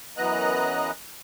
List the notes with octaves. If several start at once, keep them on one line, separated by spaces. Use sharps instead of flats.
F#2 E3 B3 D#5 A#5 F#6